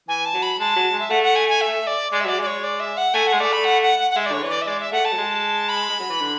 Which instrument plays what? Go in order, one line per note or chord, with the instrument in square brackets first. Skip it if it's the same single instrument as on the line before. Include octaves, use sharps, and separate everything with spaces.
[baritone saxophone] E3 [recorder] G#5
[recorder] A5
[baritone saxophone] F#3
[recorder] B5
[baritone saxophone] G#3 [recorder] A5
[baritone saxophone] F#3
G#3
[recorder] E5
[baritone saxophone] A3 [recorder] F#5
[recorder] F#5
G#5
G#5
E5
D5
[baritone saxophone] G#3 [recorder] D5
[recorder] E5
[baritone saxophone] F#3 [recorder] D5
[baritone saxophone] G#3 [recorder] D5
[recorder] C#5
D5
E5
F#5
[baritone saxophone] A3 [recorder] G#5
[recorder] F#5
[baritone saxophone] G#3
[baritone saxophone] A3 [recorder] D5
[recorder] B5
F#5
F#5
F#5
F#5
[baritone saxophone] G#3 [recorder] E5
[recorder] D5
[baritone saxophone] D3 [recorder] C#5
[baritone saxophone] E3 [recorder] C#5
[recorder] D5
E5
[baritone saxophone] G#3 [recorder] D5
[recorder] E5
[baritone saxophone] A3 [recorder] F#5
[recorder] A5
[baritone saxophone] F#3
G#3
[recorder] B5
[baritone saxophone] G#3
F#3
E3
D3